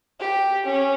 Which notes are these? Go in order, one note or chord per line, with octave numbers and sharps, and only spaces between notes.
G4
C#4